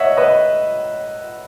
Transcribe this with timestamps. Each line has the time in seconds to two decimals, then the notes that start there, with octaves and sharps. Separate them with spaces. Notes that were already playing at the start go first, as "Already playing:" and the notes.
Already playing: C#5 D#5 E5 F#5
0.17 B4 D#5